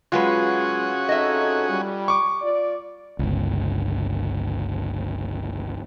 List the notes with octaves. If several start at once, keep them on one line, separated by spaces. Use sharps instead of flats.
F#3 G#3 C#4 F4 F#4 G#4 B4
F2 D#4 A4 D#5 E5
G3
C#6 D6
F4 D5
G1 C#2